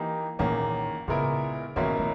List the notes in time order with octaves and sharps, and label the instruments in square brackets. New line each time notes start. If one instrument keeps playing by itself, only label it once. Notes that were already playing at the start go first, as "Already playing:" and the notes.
Already playing: [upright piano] E3 A#3 D#4 G4
[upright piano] E2 D#3 A#3 C#4 [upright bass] A#2
[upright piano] A#2 G#3 B3 E4 A#4 [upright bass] C#3
[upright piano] C#2 B2 A#3 C#4 E4 [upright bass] D#3
[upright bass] D#3